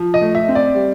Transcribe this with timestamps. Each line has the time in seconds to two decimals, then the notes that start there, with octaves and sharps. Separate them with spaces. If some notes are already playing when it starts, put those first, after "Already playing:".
Already playing: F3
0.14 D#5
0.21 A3
0.35 E5
0.48 C4
0.55 D5
0.75 G3